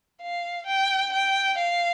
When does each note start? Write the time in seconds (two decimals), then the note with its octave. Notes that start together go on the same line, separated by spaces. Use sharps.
0.21 F5
0.67 G5
1.13 G5
1.58 F5